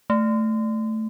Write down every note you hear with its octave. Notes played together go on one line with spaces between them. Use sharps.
A3